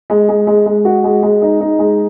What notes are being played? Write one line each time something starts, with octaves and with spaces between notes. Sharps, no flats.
G#3
G#3
G#3
G#3
F#4
G#3
G#3
D#4
D#4
G#3